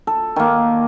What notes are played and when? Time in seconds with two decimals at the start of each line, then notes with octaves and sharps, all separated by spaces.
0.07 A4
0.36 D#3 A#3